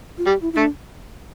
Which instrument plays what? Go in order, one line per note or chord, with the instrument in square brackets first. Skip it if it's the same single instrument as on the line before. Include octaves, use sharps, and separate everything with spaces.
[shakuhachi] F4
[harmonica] G3 [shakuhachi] G4
[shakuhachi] E4
E4
[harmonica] A3 [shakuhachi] D4